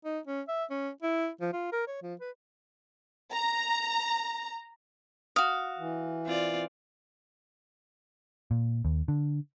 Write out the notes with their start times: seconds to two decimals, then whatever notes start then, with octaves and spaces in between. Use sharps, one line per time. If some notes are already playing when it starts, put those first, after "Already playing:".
0.05 D#4
0.27 C#4
0.48 E5
0.70 C#4
1.02 E4
1.41 F3
1.53 F4
1.72 A#4
1.87 C#5
2.02 F3
2.21 B4
3.33 A#5
5.36 F#4 F5 D#6
5.79 E3
6.25 C4 F4 D5
8.51 A#2
8.85 D#2
9.08 D3